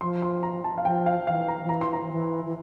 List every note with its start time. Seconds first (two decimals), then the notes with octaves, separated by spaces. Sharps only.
0.01 F3 C6
0.22 C6
0.43 A#5
0.64 A5
0.78 F5
0.85 F3 G5
1.06 F5
1.27 E3 F5
1.48 A#5
1.63 F3
1.69 E3 A#5
1.81 C6
1.93 A#5
2.11 E3
2.46 E3